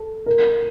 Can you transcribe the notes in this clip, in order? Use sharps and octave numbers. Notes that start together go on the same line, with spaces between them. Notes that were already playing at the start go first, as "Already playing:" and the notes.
Already playing: A4
A#4